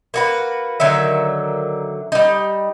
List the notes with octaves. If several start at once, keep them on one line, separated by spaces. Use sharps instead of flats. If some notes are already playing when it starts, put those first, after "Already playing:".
A#3 F#4 B4
D3 D#3 F#3 E5
G3 D#4